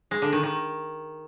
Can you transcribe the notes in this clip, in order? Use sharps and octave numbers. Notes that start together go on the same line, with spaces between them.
G#3
D3
D#3
D#3